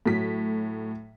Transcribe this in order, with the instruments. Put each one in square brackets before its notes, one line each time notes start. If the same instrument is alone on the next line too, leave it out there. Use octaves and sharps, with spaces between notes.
[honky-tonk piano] A2 F#3 B6